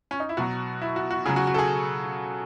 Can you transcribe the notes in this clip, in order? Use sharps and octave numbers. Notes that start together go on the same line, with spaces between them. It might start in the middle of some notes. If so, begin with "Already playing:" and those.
C#4
D#4
E4
B2 F#3 F#4
E4
F#4
F#4
C#3 F#3 G#4
F#4
F#4
A4
G#4